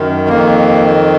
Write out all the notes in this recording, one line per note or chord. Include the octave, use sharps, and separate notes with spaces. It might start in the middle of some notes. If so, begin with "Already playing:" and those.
Already playing: F#2 D#3
F2 D#3 A#3